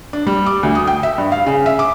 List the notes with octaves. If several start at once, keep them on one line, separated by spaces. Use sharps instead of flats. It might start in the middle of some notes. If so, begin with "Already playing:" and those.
D4
G3
D6
D2
D#6
G5
E5
G2
F5
C#3
E5
D6